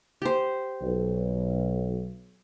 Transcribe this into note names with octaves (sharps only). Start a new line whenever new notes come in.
G4 C5
B1